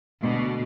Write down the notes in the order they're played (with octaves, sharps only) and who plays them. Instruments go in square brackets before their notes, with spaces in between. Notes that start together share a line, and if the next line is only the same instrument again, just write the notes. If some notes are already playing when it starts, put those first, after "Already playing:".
[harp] D2 D3 G#3 D4 F#4 [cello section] B2